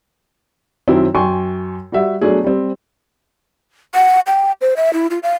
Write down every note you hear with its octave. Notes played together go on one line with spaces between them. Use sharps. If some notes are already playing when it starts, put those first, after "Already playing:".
F#2 D#3 F#3 C4 D#4 E4
F#2 G5 G#5 C6 C#6
G3 F#4 E5
B2 F#3 A3 D4 G#4
G3 C4
F#5
G5
C5
E5
E4
F4
F5